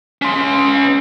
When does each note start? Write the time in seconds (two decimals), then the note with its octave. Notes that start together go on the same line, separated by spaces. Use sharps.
0.22 C#4 C6